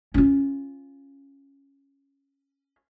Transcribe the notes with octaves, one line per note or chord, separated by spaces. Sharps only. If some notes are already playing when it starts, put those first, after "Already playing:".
C#4 F4